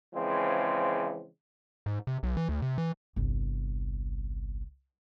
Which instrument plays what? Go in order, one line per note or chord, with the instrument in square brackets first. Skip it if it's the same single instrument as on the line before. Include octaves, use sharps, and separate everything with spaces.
[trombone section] C#3 E3 F3 G#3 C4
[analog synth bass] G#2
C3
B1
E3
D2
C3
E3
[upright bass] G1 C2